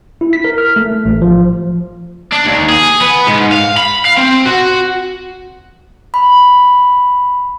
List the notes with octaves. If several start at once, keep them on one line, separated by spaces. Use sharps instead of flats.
E4
B6
A#4
F6
A3
A1
F3
D4
D#2
G#4
B3
G#2
F5
B5
F5
C4
F#4
B5